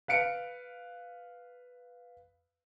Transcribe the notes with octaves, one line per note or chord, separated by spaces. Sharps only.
B4 F5 C#7 D7